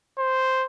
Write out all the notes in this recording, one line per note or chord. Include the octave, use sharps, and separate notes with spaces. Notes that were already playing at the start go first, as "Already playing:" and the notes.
C5